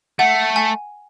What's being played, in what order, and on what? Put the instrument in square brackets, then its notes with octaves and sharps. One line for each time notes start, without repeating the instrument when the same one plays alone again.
[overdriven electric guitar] A3 [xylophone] F#5
[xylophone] G#5